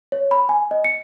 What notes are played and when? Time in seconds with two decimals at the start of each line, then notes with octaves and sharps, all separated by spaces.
0.12 C#5
0.31 B5
0.49 G#5
0.71 D#5
0.84 C#7